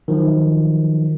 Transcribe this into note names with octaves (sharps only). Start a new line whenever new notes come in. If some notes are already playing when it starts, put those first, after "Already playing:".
D#3 F3 F#3